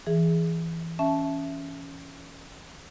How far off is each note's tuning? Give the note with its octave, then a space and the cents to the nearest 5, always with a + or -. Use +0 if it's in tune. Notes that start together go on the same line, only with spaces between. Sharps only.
E3 +5 G#4 +0
C#4 +0 E5 +10 A5 -15